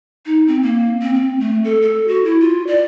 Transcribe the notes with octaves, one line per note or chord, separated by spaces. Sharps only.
D#4
C4
A#3
C4
C4
A3
A4
A4
F#4
E4
F4
D5